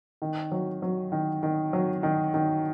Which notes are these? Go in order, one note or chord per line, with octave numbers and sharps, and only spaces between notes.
D#3
F#3
F#3
D#3
D#3
F#3
D#3
D#3